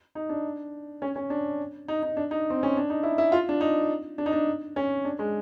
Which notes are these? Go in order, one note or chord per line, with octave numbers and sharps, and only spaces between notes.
D#4
D4
C#4
C#4
D4
D#4
D#4
D4
D#4
C4
C#4
D4
D#4
E4
E4
F4
D4
D#4
D4
D#4
D4
C#4
D4
G#3